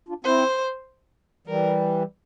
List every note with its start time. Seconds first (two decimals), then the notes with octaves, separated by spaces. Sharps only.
0.09 D4 F4
0.24 C4 E4 C5
1.47 E3 G3 A#4